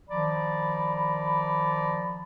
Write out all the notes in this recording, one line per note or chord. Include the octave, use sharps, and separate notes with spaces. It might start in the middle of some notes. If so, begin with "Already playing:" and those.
D#3 F3 D5 A#5 B5